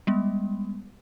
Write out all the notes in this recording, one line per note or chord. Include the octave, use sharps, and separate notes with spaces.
G3 G#3 B3